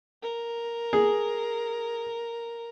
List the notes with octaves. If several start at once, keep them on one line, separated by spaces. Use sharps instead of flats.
A#4
G#4